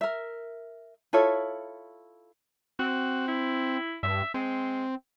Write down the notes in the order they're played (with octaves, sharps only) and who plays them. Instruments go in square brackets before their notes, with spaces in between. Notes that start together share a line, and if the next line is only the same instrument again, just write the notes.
[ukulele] A#4 E5
E4 F4 A4 C#5
[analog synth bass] C4 [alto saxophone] F#4
[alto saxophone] E4
[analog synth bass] G2 [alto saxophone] E5
[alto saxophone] G#3 [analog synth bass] C4